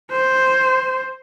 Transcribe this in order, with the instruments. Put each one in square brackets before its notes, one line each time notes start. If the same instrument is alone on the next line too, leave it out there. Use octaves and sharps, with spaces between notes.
[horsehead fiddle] C5